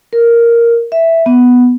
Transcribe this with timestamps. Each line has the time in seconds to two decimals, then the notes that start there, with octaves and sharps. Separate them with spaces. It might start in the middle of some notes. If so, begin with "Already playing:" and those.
0.13 A#4
0.92 E5
1.26 B3